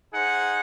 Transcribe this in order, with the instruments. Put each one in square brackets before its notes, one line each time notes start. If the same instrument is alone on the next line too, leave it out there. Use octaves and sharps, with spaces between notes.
[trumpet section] D#4 G#4 C5 F#5